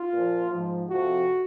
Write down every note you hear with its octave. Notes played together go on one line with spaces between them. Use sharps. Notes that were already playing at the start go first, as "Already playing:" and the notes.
Already playing: F4
A#2 F3
G#2 F3
F2 C3 F3 F#4